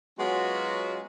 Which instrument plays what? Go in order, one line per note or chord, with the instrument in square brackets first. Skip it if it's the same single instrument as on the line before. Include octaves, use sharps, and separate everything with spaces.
[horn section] F#3 G#3 B3 C#4 F4 F#4